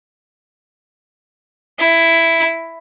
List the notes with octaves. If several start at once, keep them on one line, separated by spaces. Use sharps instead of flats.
E4